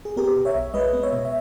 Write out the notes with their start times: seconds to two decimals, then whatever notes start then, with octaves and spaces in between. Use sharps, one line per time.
0.05 G#4
0.16 B3 G4 A#4
0.36 B2
0.45 C#5 E5
0.55 B1
0.74 G#3 B4 D#5
0.93 B3
1.03 C#5 E5
1.13 B2
1.25 E5